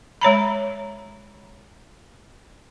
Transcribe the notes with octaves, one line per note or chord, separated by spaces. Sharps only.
G#3 C#5 A#5 B5